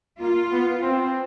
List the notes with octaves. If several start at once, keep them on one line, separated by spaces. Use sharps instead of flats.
A#3 F4
B3
C4